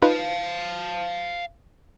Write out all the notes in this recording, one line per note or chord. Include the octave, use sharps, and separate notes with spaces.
D#4 F4 B4 F5 A5